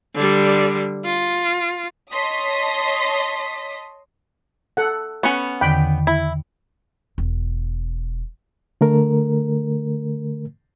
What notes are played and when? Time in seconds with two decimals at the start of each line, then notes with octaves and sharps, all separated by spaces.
0.15 D3 G3
1.05 F4
2.12 C#5 D#5 A5 C6 D#6 B6
4.77 A4 F#5
5.23 B3 C#4 F#5 C#6
5.61 E2 D3 D#3 G5 B5
6.07 E4
7.18 E1
8.81 D3 A3 A#4